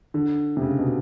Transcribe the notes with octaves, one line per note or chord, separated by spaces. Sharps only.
D3
C3
C#3
B2